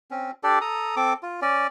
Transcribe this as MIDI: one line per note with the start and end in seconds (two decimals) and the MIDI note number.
0.11 0.31 60
0.11 0.31 61
0.43 0.59 62
0.43 0.59 67
0.43 0.59 69
0.43 0.59 74
0.61 0.95 69
0.61 0.95 82
0.61 0.95 87
0.96 1.13 60
0.96 1.13 69
0.96 1.13 86
1.23 1.40 65
1.42 1.67 61
1.42 1.67 74